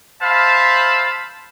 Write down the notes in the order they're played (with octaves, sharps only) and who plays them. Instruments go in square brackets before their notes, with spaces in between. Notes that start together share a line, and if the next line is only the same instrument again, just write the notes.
[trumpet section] C5 E5 F5 A5 B5